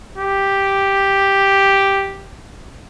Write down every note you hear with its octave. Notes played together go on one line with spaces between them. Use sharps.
G4